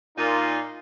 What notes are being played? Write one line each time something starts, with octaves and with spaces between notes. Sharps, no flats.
A#2 D#4 F4